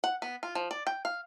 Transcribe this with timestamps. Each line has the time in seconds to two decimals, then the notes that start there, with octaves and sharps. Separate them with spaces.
0.04 F#5
0.22 B3
0.43 F4
0.55 F3
0.71 D5
0.87 G5
1.05 F5